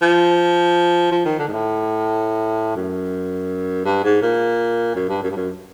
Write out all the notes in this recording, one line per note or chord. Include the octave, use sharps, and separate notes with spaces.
F3
F3
D#3
D3
G#2
A2
F#2
G2
G#2
A#2
F#2
G2
F#2
G2
F#2